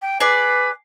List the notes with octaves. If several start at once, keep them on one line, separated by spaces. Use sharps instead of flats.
G5
G#4 B4 D5